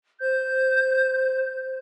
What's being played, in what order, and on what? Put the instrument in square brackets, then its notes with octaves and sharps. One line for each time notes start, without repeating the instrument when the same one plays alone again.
[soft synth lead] C5 [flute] G6